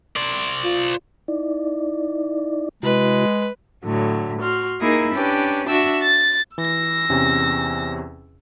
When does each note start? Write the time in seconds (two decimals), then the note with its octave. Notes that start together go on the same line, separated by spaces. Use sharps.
0.16 C5 D5
0.64 F4
1.28 D#4 E4 D5
2.83 C3 G#3 E4 F#4 B4
3.83 A2 D3 F#3
4.41 F#4 C6 F6
4.80 A#3 D#4 E4 G#4 A#4
5.14 C#4 D4 G4 B4
5.67 D4 F#4 E5 E6
6.03 A6
6.58 E3 E6 A#6
7.09 E2 C3 C#4